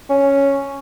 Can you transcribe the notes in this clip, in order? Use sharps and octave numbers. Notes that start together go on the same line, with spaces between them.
C#4